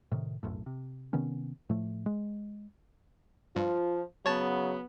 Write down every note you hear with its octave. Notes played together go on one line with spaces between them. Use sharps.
A2 C3 D#3
F1 B1 F#2 A2
C3
C3 D#3 B3 C#4
A2 F3 A3
G#3
G2 F3 F4
C#3 F#3 B3 C#5 A5